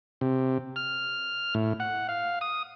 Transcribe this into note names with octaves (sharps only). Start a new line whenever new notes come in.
C3
F6
A2
F#5
F5
D#6